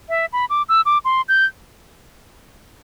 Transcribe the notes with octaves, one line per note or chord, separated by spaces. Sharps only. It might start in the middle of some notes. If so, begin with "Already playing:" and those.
E5
B5
D6
E6
D6
C6
G6